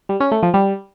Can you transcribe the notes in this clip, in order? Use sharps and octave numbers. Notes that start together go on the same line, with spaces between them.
G3
C#4
A3
F3
G3